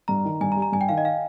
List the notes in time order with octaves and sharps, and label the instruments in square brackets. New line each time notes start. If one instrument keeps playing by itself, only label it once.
[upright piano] G2 [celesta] A#5
[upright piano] D#3
[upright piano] G2 [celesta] G#5
[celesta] A#5
[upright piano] G3
[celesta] A#5
[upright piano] G2 [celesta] G#5
[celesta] G5
[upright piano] D#3 [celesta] F5
[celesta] D#5
F5